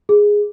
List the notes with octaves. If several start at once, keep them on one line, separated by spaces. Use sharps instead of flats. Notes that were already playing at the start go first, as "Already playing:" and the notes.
G#4